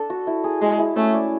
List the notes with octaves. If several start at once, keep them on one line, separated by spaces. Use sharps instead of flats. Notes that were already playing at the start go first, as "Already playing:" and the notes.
Already playing: D4 A4
F#4
E4
G#4
G#3 G#4
E4
A3 C#4
D5